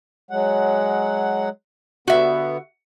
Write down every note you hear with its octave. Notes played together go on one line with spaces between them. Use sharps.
F#3 G#3 F#5
D3 B3 F#4 E5